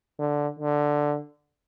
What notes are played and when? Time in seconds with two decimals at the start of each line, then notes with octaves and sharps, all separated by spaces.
0.19 D3
0.60 D3